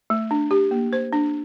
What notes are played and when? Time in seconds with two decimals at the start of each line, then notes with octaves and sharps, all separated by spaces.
0.10 A3
0.31 D4
0.51 G4
0.71 A#3
0.93 C5
1.13 D4